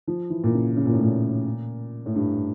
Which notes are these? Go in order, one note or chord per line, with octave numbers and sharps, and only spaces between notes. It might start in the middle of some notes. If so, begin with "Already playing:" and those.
F3
E3
A#2
C#3
C#3
A#2
A2
A#2
A2
G2